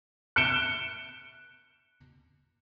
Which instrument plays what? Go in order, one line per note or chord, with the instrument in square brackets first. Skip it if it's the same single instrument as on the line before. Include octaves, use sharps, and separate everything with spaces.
[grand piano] F#6 C#7 D7 E7 G7